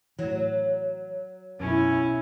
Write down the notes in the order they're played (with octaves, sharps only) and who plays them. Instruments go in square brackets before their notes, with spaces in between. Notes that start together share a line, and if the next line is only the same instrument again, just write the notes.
[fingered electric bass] A2 E3 [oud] F#3
[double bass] B1 E4 [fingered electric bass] F#2 [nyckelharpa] C#4